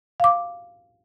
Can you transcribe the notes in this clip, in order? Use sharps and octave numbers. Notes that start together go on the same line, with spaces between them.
F5 D6